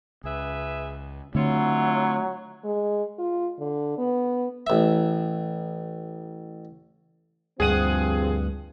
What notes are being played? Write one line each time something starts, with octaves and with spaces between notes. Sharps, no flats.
C#2 G#4 B4 E5
D3 F#3 A3 C4 E4 F4 C#5
G#3
F4
D3
B3
A1 E5
D2 G2 F3 C4 G#4 F#5 D#6 D#7